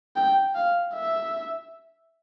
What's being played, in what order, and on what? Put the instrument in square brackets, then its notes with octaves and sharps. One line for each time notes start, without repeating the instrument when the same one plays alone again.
[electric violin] G5
F5
E5